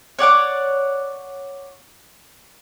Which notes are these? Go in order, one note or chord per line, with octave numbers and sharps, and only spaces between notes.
C#5 D5 F#5 D6